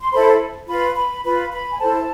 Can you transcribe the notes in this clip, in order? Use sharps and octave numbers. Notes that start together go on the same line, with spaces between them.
C6
E4 A4 C5 B5
F4 B4 B5
B5
F4 B4 B5
B5
G#5
E4 A4 C5 A5